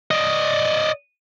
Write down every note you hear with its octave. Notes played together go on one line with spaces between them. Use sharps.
D5 D#5